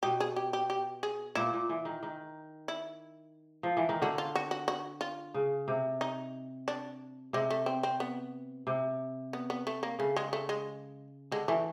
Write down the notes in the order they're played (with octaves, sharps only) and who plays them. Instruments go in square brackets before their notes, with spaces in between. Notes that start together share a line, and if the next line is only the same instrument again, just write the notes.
[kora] B2 [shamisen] G4
[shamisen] G#4
G4
G4
G4
G#4
[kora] A#2 [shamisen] E4
[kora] A#2
E3
D#3
D#3
[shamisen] E4
[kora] F3
E3
D#3
[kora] D3 [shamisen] F#4
[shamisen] F4
F#4
F#4
F#4
F4
[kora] C#3
C3
[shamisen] D#4
D4
[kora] C3 [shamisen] G#3
[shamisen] A3
C4
C4
B3
[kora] C3
[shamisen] B3
B3
A3
A#3
[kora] C#3 [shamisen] A3
[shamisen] G#3
A3
G#3
[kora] D3 [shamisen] G#3
[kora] E3 [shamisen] A3